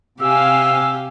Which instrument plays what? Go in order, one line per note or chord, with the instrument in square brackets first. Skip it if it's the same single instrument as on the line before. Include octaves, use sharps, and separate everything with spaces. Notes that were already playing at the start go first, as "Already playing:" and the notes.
[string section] C3 F5 G#5 [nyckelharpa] G4 [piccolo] E6